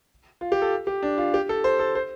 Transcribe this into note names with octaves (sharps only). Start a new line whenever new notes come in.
F4
G4
A4
G4
D4
F4
G4
A4
C5
A4
C5